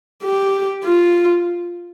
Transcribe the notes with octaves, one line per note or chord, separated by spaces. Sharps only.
G4
F4